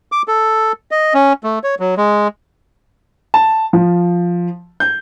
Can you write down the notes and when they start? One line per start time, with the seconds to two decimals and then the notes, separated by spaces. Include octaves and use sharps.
0.12 D6
0.28 A4
0.91 D#5
1.14 C#4
1.44 A3
1.64 C#5
1.80 F#3
1.97 G#3
3.34 A5
3.73 F3
4.80 G6